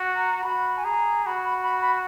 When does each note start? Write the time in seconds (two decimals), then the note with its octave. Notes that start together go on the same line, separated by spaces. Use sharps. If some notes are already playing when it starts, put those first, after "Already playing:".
Already playing: F#4
0.16 A#5
0.39 A#5
0.43 F#4 B5
0.78 G#5
0.85 G#4 A#5
1.26 F#4 B5
1.44 B5
1.63 B5
1.82 B5